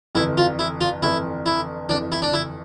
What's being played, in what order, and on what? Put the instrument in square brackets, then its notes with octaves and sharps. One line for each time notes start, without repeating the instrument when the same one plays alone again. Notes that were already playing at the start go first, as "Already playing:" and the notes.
[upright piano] G1 F2 E3 [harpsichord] E4
[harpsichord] F4
E4
F4
[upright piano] G1 F2 E3 [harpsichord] E4
[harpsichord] E4
[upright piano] G1 F2 E3 [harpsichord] D4
[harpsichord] E4
D4
E4